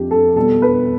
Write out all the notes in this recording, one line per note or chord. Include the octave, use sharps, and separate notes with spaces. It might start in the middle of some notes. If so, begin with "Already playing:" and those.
Already playing: F2 G4
A4
B2 G3 A4
B4